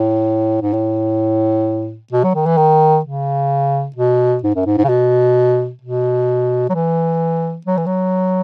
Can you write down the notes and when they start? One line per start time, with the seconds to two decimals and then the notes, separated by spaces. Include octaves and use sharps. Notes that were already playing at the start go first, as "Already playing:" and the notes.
Already playing: A2
0.62 G#2
0.73 A2
2.12 B2
2.24 F#3
2.34 D#3
2.46 E3
2.57 D#3
3.05 C#3
3.96 B2
4.43 G#2
4.55 F#2
4.66 G#2
4.77 G#2
4.84 C#3
4.89 B2
5.81 B2
6.69 F#3
6.74 E3
7.67 F#3
7.77 E3
7.86 F#3